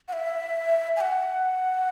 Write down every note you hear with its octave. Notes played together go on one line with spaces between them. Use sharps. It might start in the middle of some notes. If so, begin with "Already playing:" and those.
F#5
E5
G#5
F#5